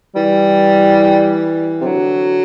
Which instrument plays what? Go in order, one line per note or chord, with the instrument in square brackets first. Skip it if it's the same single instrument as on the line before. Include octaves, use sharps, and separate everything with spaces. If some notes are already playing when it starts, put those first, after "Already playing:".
[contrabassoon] E3 [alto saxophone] G3
[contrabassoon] C3
[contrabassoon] D3 [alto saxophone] F#3